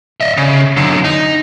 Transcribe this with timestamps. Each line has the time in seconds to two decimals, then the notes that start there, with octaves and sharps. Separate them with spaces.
0.21 D#5 E5
0.37 C#3
0.77 F#2 D3
1.04 D#4